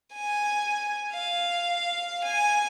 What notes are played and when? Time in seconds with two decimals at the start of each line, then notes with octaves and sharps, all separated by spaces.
0.14 G#5
1.13 F5
2.24 G#5